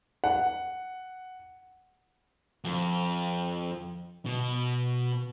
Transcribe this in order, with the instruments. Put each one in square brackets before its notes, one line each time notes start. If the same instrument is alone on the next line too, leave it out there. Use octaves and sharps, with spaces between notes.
[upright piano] F#5
[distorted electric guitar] F2
B2